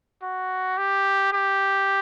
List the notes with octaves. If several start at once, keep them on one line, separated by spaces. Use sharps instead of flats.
F#4
G4
G4